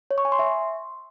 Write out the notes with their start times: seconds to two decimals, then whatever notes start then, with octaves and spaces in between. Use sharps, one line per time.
0.11 C#5
0.18 C#6
0.25 G#5
0.32 C6
0.39 E5